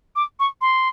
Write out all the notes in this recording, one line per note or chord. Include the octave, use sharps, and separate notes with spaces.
D6
C#6
C6